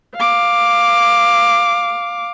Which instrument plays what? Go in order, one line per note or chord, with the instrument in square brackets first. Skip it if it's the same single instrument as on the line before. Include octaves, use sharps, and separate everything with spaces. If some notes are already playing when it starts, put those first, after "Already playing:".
[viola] F5 D6